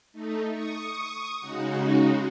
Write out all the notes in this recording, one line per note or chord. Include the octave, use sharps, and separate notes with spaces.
A3 D#4
C#6 D#6
C#3 G#3 D#4 F#4